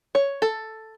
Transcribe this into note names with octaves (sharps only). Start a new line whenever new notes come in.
C#5
A4